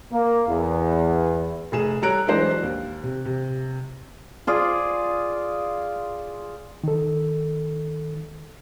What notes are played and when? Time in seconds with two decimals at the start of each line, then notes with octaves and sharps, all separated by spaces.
0.13 A#3
0.48 E2
1.72 F1 G#4 E7
2.02 G3 A4 C#5 A#5 F#6 D7
2.27 E3 F#3 G#3 D4 C5
2.63 D#2
3.03 C3
3.25 C3
4.47 F4 G#4 D5
6.84 D#3 A4